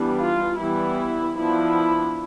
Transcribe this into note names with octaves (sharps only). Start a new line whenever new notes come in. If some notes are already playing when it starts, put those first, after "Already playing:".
Already playing: E3 G3 B3 D4
F4
E3 G3 B3 E4
F3 B3 D4 E4